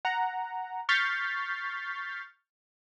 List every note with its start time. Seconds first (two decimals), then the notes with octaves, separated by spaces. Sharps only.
0.05 F#5 A#5
0.89 C#6 F6 G6 A6 B6 C7